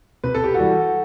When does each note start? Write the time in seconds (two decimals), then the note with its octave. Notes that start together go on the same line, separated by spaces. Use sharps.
0.24 C3 B4
0.35 A4
0.44 G4
0.54 E3 G3 F#4 A4